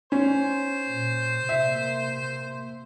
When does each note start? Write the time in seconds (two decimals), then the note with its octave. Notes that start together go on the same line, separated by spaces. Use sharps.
0.12 C#4 C5
0.87 A#2
1.49 C3 A#3 E5